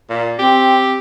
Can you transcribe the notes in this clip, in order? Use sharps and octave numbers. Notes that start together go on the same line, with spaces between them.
A#2
C4 G4